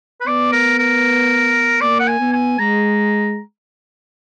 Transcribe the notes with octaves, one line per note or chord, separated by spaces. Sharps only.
B4
B3 D5
A#4
A#4
A#3 D5
F#5
G#5
B3
G#5
G#3 A#5